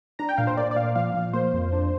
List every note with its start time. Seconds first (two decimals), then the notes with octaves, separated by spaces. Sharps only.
0.19 D4 A#5
0.29 G5
0.38 A#2 F5
0.47 C5
0.57 A#3 D5
0.71 D5
0.76 A#2 F5
0.95 F3 F5
1.14 F3
1.33 A#3 C5
1.54 F2
1.73 D4